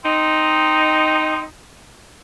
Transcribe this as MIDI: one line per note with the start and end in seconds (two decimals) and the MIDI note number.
0.05 1.43 60
0.05 1.43 63